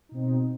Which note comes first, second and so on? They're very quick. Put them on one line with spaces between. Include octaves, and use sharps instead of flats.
D#4 B2 C4